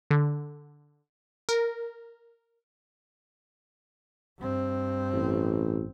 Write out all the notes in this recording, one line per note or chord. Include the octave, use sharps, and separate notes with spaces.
D3
A#4
G2 C4
A1